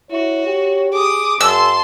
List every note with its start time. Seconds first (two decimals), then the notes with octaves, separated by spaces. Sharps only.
0.11 E4 F#4 C#5
0.47 G4
0.92 G#4 D6 D#6
1.41 F#2 G#4 A5 C6 E6